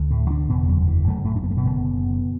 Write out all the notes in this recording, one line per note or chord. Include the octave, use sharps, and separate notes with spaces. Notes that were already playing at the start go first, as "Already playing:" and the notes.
Already playing: D2 D3
A2 A3
D3 D4
F#1 E2 B2 D3 B3
F#2 F#3
E3
F#1 F#2 D3 A3
F#3
A2 A3
D4
B3
A3
B2 B3
F#1 F#2 D3